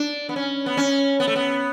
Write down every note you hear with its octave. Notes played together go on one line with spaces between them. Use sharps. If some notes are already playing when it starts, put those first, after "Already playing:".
Already playing: D4
B3
C#4
B3
C#4
B3
A3
B3